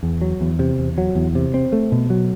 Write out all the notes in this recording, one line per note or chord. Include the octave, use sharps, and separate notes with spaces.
E2
F#3
E2
C3
E2
F#3
E2
C3
C4
A3
B2
F#3